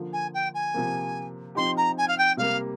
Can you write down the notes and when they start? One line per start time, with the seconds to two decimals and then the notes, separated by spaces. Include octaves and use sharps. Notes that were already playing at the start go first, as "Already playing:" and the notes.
Already playing: D3 F3 A#3 F4
0.12 G#5
0.34 G5
0.54 G#5
0.74 C3 F3 A#3
1.55 F3 C4 D#4 G4 C6
1.77 A#5
1.97 G#5
2.07 F5
2.18 G5
2.37 C3 G3 A#3 F5